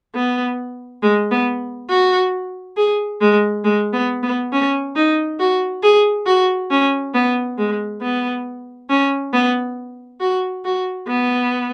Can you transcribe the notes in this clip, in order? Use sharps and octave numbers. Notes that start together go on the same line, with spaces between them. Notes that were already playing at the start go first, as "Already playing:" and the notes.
B3
G#3
B3
F#4
G#4
G#3
G#3
B3
B3
C#4
D#4
F#4
G#4
F#4
C#4
B3
G#3
B3
C#4
B3
F#4
F#4
B3